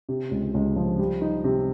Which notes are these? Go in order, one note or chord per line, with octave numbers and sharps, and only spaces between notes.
C3
C#2
C#2
F3
G3
D#4
C3